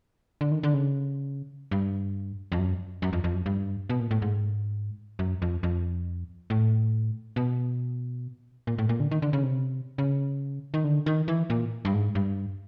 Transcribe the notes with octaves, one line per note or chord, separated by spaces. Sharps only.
D3
D#3
D3
C#3
G2
F2
F#2
F#2
F2
F2
F#2
G2
B2
A#2
A2
G#2
F#2
F2
F2
A2
B2
A#2
A2
A#2
D3
D#3
D3
C#3
C3
C#3
D#3
D3
D#3
E3
A#2
G2
G#2
G2